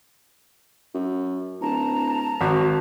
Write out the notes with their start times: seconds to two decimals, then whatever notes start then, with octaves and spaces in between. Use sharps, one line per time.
0.94 F#2
1.61 D1 A5 A#5
2.41 G#1 F#4